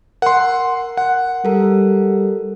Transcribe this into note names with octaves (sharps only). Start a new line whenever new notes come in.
A#4 F#5 C6
F#5
G3 A4 A#4